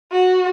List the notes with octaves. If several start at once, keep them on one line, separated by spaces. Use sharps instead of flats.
F#4